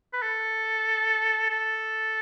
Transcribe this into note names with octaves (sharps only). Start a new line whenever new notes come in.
B4
A4
A4